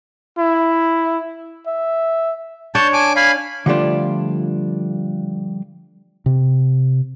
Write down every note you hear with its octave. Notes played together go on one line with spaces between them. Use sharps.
E4
E5
D4 C#5 D5 A5 G6
G#5 A5 D6
F5 G#5 B5 G#6
D3 F3 G3 A3 D4 F4
C3